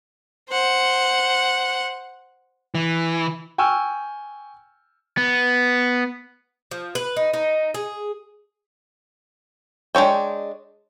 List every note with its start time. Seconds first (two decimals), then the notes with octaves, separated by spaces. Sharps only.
0.50 C5 F#5
2.75 E3
3.58 G5 G#5 C#6 E6 F6
5.17 B3
6.71 F3
6.95 B4
7.17 D#4
7.34 D#4
7.74 G#4
9.95 G#3 D4 C#5 G5